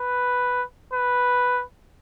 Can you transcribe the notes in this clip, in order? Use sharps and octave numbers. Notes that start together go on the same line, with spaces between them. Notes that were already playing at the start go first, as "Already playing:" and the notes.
Already playing: B4
B4